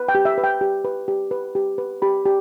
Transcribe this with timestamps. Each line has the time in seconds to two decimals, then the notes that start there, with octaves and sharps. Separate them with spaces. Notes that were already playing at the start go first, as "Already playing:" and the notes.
Already playing: B4
0.08 G5
0.15 G4
0.25 E5
0.38 B4
0.44 G5
0.61 G4
0.85 B4
1.08 G4
1.31 B4
1.55 G4
1.78 B4
2.02 G4 B5
2.26 G4